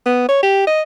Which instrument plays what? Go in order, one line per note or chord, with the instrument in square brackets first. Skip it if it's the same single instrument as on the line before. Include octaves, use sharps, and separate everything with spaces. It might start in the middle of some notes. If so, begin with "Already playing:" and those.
[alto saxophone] B3
C#5
G4
D#5